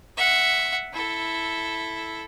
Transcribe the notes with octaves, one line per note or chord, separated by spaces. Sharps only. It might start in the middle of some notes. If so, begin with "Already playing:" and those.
E5 F#5
E4 A4